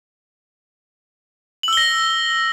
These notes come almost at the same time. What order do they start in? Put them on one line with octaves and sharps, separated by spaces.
F#7 E6 G7 A#6